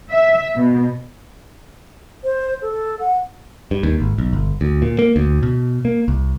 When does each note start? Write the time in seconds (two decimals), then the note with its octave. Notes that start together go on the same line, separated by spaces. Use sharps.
0.11 E5
0.57 B2
2.24 C5
2.62 A4
3.00 F#5
3.71 G2
3.83 D#2
4.00 G#1
4.18 B1
4.33 G1
4.61 D2
4.82 A#2
4.99 A#3
5.16 D2
5.43 B2
5.85 A#3
6.08 C2